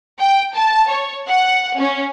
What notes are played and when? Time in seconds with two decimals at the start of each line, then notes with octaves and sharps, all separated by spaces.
0.20 G5
0.55 A5
0.90 C#5
1.28 F#5
1.79 C#4